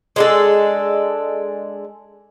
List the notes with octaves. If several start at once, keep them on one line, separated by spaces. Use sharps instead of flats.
G#3 D4 A4